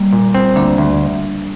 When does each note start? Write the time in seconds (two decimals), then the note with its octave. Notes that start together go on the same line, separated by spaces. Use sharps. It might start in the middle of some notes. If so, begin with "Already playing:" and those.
Already playing: G3 A#3
0.13 A#2
0.34 C4
0.56 D2 A#3 D4
0.78 D2